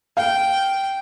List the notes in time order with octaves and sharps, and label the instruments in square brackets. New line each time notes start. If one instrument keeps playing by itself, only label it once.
[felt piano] F5 [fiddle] G5